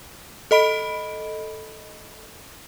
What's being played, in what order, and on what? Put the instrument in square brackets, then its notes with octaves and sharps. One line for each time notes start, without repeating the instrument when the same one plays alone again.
[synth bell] A4 D#5 B5 D7